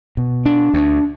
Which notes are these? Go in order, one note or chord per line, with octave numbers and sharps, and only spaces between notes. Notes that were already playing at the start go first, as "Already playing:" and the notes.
B2
D4
D2